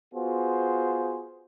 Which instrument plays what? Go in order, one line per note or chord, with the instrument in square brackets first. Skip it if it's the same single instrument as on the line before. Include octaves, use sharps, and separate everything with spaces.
[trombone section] B3 F4 F#4 G#4 C5